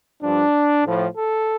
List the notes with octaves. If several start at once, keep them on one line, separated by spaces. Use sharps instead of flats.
G2 F3 D4
A2 F3
A4